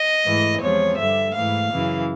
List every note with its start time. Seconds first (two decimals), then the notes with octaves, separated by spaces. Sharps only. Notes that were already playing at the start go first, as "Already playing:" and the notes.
Already playing: D#5
0.24 G#2 E3 A3
0.61 E2 C3 F3 G#3 C#5
0.97 G2 D3 G3 E5
1.34 G#2 E3 A3 F5
1.70 F#2 C#3 E3